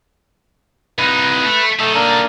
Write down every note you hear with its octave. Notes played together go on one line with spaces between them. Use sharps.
C2 D#4 B4
A3
A3 D#4 A4
A#3 D4 A#4